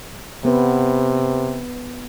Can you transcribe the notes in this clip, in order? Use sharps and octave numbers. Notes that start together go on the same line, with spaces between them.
C3 B3 B4